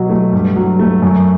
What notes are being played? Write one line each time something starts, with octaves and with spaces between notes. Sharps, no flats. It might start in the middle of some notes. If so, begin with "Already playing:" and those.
Already playing: B2 F#3
A3
G2
F#3
A3
F#2